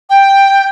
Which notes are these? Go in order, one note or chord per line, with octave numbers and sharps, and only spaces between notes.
G5